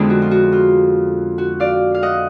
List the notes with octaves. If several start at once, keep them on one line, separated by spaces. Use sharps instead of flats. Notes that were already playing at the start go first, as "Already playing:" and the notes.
Already playing: F2 D3 G#3 B3 D4 G#4
F#4
F4
F#4
F4
F#4
D5 F5
F5
D#5 F#5